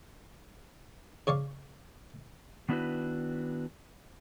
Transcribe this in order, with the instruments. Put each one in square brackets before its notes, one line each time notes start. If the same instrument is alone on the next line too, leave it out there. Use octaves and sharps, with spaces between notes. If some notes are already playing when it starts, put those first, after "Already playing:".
[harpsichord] C#3 C#5 D5 F5 C#6
[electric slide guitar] D#3 B3 D4 E4 F#4 B4